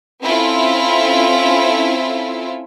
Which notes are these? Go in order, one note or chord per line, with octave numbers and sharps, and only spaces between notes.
C4 C#4 E4 F4 A4 E5